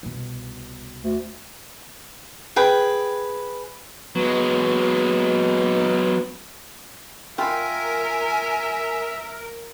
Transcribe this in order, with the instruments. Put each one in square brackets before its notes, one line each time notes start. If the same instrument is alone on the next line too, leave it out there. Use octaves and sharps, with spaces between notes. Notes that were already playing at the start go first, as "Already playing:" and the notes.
[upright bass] C2 B2
[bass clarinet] D2
[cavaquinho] G#4 B4 G5
[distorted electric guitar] F#3 G#3 [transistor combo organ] B3
[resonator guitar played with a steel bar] F4 G5 [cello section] A#4 [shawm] E5 [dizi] G#5